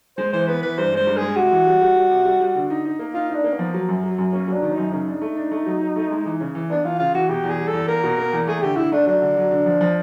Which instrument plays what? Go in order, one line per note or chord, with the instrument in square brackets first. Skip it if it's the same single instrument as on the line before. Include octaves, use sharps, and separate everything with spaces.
[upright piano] G#3 [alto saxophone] C5
[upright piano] E3 [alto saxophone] C5
[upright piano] B3 [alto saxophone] B4
[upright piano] E3 [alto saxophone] B4
[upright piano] G2 [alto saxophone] C5
[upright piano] G#3 [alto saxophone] C5
[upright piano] G2
[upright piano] G#3 [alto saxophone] G#4
[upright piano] C3 [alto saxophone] F#4
[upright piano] E3
G3
G3
G3
C3
G3
G3
D3
D#4
D#4
A#3
[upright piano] D#4 [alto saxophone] F4
[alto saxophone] D4 [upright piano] D#4
[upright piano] A#3
[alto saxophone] B3
[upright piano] F3
F#3
F#2
F#3
F#2
[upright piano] A#3 [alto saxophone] C#4
[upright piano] F#3
[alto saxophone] D4
[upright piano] D#3
[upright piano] F#2 [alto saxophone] D#4
[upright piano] C#3 [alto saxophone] D#4
[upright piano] D4
A3
D4
A3
F#3
F#3
A3
G#3
E3
C#3
E3
[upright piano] B3 [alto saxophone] D4
[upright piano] E3 [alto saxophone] F4
[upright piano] C#3 [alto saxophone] F4
[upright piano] E3 [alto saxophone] F#4
[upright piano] B2 [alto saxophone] G4
[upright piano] E2
[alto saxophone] G#4
[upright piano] G3
[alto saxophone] A4
[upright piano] E2
[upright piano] A#3 [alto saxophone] A#4
[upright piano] B2
A#3
E2
[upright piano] A3 [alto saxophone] G#4
[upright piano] D3 [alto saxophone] G4
[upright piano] D3 [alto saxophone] E4
[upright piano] A3 [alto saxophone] D4
[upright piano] F#3 [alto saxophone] D4
[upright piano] D3
F#3
D3
F3
F3